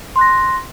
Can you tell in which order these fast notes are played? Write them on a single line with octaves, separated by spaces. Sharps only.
C6 F#6 A#6